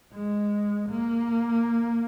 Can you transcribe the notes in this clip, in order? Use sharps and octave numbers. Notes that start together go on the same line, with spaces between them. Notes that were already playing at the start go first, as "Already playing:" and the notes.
G#3
A#3